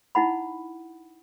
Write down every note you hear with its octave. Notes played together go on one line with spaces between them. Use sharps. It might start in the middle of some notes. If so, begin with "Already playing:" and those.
D#4 E4 F#5 B5